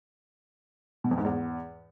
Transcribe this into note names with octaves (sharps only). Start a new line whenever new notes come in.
B2
F2
G#2
E2